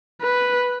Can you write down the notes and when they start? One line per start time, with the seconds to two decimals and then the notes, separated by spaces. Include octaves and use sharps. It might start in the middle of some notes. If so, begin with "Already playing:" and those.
0.22 B4